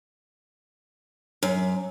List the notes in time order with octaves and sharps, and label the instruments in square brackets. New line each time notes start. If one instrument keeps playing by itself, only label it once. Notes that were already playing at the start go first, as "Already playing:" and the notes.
[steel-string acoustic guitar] F#2